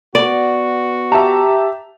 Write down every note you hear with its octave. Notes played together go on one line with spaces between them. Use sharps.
B3 F#4 D5
G4 E5 A5 A#5